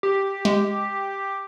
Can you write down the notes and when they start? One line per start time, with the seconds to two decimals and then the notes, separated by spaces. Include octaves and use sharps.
0.03 G4
0.45 G#3